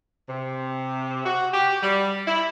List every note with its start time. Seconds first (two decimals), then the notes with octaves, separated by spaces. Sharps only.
0.29 C3
1.26 F#4
1.53 G4
1.83 G3
2.28 E4